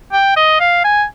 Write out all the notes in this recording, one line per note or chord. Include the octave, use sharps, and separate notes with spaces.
G5
D#5
F5
G#5